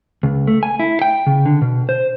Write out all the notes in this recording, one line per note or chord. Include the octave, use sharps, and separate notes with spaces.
C#2
A3
G#5
E4
G5
C#3
D3
B2
C5